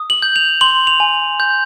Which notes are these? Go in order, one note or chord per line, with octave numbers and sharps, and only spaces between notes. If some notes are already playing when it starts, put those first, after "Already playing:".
Already playing: D#6
F#7
G6
F7
C6 F#7
F7
G#5
G6